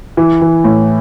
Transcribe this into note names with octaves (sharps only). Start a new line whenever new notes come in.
E3
E3
A2